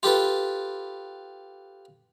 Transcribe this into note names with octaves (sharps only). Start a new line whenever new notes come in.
F4 G4 A4 B4